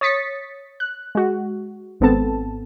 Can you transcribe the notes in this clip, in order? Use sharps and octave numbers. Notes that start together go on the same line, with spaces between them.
C#5 D#6 A6 B6 C#7
F#6
G#3 F#4
G#1 G#2 B3 C4 A4 A5